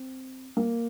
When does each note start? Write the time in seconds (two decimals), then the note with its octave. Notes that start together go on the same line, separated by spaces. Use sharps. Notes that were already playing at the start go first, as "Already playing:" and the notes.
Already playing: C4
0.57 A#3